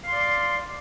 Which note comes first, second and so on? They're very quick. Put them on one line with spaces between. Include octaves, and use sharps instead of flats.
F5 C6 D5